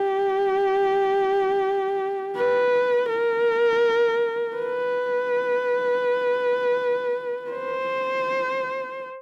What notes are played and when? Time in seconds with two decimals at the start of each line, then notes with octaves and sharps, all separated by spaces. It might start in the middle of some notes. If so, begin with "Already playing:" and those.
Already playing: G4
2.36 B4
3.09 A#4
4.57 B4
7.51 C5